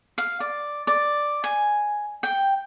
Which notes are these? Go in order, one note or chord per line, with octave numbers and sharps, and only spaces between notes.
F5
D5
D5
G#5
G5